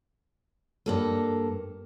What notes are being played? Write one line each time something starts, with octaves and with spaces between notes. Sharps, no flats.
G2 A#3 A4